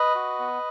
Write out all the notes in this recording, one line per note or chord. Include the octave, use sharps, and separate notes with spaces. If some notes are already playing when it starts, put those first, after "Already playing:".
Already playing: B4 D#5
F#4
B3